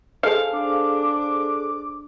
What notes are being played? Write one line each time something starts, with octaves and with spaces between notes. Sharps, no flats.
G#4 A4 C5 F5
D4 D6